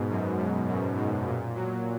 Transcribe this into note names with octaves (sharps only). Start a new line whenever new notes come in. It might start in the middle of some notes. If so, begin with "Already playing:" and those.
Already playing: G#2 B2
F#2
F#2
F#2
G#2
A#2
F#3